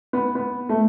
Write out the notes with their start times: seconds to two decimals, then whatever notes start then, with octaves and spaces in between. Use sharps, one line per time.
0.13 B3
0.35 B3
0.69 A3